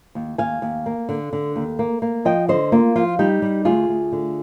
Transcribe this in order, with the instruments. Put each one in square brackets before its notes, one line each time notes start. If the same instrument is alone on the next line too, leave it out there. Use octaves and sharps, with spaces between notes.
[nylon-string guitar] D#2
D#2 F5 G#5
D#2
A#3
D3
D3
D#2
A#3
A#3
F3 D#5 G5
D3 C5 D#5
A#3 F4
F3 F4
G3 D#4 G4
G3
D2 F4 G#4
D2
D3